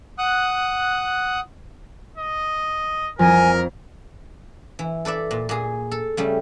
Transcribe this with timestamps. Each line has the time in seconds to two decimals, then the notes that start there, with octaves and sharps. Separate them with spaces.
0.18 F#5 D#6 F#6
2.18 D#5
3.19 F2 F3 A#4 G#5
4.79 E3
5.05 A4 B4 D5 E5
5.31 A#2
5.49 A#2 G#4
5.91 A4
6.17 C#3 G3 A3